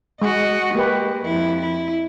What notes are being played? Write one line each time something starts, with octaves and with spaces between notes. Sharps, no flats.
G#3 F#4 D#5
G#3 A#3 G4 B4
F2 E4
E4